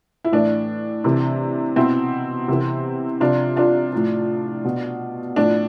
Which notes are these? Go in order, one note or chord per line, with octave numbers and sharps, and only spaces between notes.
E4
A2 E3 D4
C3 E3
B2 C4 E4
C3 E3
C3 F3 D4 F4
D4 F4
A2 F3
B2
A2 F3 D4